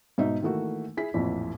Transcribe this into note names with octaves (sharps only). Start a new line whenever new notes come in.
G#2 B2 D#4 E5
D#3 E3 A3 A#3 F#4
E4 G#4 B6
A1 F2 A#2 E3